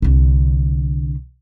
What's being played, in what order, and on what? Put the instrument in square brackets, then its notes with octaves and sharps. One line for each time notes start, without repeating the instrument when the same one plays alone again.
[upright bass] C2 D3